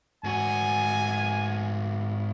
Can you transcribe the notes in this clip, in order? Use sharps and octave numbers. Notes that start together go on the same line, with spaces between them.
G#2 F#4 G#5